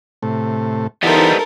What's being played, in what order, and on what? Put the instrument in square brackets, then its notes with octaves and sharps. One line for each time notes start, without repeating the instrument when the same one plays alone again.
[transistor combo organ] A2 C3 A3
[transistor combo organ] E3 [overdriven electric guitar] G3 B3 [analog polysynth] D#4 E4 C5 [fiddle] A4 A#4